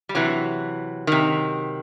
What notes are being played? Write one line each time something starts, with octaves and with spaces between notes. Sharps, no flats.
G3
C3 E3 F#3
C3 D#3